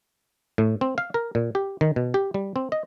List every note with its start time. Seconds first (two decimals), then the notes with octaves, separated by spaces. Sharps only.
0.58 A2
0.81 C4
0.98 F5
1.14 A#4
1.35 A#2
1.55 G4
1.81 D#3
1.96 B2
2.14 G4
2.34 G3
2.56 C4
2.72 D#5